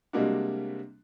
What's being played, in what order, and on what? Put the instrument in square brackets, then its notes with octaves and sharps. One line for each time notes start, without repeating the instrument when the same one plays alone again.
[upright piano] C3 G3 G#3 A#3 D4 F#4